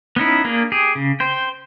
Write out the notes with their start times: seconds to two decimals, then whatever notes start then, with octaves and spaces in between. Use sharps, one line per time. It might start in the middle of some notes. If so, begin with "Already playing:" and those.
0.16 B3 C#4 D#4 E4
0.45 A#3 D4 G#4
0.72 G4 G#4
0.95 C#3
1.20 C5 G5